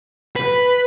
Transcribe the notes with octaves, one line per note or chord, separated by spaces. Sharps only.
B4